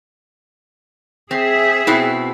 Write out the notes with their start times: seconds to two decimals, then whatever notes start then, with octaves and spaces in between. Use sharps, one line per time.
1.31 C4 G#4 E5
1.87 B2 C4 E4